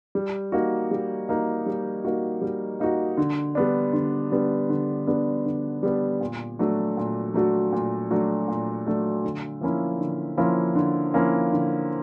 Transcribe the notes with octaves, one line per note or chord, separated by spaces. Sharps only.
G3
A#3 D#4 F#4
G3
A#3 D#4 F#4
G3
A#3 D#4 F#4
G3
A#3 D#4 F#4
D3
G3 B3 D4
D3
G3 B3 D4
D3
G3 B3 D4
D3
G3 B3 D4
A#2
F#3 A3 D4 F#4
A#2
F#3 A3 D4 F#4
A#2
F#3 A3 D4 F#4
A#2
F#3 A3 D4 F#4
D3
F3 A#3 C#4 E4
D3
F3 A#3 C#4 E4
D3
F3 A#3 C#4 E4
D3